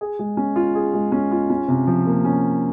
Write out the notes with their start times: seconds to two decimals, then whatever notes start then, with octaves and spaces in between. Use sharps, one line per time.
0.01 G#4
0.19 G#3
0.37 C#4
0.56 F4
0.75 G#4
0.94 G#3
1.12 C#4
1.31 F4
1.50 C#4
1.68 C3
1.87 F3
2.06 A#3
2.25 C#4